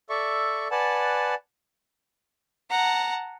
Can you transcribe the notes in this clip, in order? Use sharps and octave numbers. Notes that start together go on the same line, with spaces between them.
A4 D5 E5 C#6
B4 D5 F#5 G#5 A5
F#5 A5 A#5